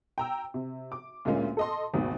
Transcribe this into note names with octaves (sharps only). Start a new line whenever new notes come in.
G5 A#5 E6
C3
D6
D2 A#2 G#3 A#3 C#4
A4 D#5 C6
G#1 D#2 B2